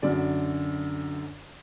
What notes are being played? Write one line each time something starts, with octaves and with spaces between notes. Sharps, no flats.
F#2 D3 D5